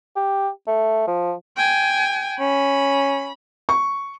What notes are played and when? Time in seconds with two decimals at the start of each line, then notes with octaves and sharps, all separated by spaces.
0.16 G4
0.67 A3
1.07 F3
1.57 G5 G#5
2.40 C#4 B5
3.69 C#6